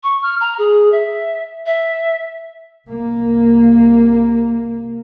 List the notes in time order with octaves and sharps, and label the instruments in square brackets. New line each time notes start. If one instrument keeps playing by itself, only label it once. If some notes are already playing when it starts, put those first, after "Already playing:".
[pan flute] C#6
F6
A#5
G#4
E5
E5
[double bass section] C2 A#3